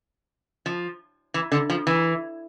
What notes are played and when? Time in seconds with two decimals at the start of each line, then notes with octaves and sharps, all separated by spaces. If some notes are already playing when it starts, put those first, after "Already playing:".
0.66 F3
1.34 E3
1.52 D3
1.70 F3
1.87 E3